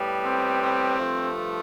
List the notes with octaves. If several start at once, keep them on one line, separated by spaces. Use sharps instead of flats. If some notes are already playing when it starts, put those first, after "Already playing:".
Already playing: A2 G3 B3
C4
C4
G2 F3 A3